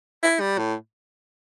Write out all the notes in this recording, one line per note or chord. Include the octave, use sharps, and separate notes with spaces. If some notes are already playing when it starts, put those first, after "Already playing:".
E4
G3
A2